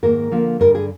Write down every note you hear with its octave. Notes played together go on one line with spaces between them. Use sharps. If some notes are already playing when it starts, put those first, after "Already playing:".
G#2 D#3 A#3 A#4
D3 F3 A#3
G2 D3 G3 A#4
G#4